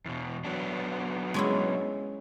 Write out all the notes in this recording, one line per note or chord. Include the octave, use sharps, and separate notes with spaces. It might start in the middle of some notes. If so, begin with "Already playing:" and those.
E2 B2
F#3 B3 D4
G#3 C#4 E4